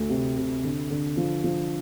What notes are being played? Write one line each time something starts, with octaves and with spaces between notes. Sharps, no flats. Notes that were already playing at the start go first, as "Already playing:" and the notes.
Already playing: D2
C3
C3
D3
D3
F3
F3